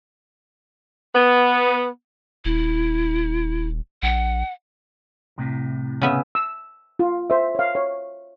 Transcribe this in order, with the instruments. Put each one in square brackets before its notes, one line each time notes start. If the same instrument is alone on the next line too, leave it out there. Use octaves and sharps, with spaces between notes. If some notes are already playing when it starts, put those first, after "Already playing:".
[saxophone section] B3
[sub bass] D#1 [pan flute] E4
[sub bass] A#1 [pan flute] F#5
[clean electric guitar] C2 A2 C3
[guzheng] C#3 B3 E5
[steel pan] E6
F4
C5 E5
C#5 F5
C#5